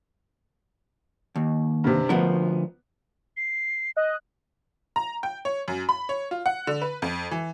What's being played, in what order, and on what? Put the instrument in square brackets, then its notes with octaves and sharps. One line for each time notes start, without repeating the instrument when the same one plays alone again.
[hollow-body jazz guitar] D#2
[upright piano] G2 C3
[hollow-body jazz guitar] D2 F3 A#4 [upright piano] B3
[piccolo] C7
[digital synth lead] D#5 [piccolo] F#6
[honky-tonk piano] A#5
G5
C#5
F#2
B5
C#5
F4
F#5
D3
B4
F2
E3